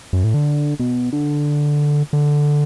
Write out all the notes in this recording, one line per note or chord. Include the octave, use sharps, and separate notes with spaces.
F#2
A2
D3
B2
D3
D3